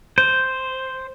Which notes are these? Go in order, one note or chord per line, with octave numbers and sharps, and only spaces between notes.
C5